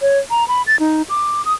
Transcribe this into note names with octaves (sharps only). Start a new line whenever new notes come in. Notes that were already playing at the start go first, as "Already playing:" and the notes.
C#5
A#5
B5
A6
D#4
D6
D#6